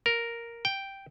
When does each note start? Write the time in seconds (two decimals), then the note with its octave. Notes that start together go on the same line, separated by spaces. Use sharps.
0.06 A#4
0.65 G5